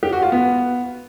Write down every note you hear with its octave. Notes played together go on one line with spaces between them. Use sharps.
G4
F#4
F4
B3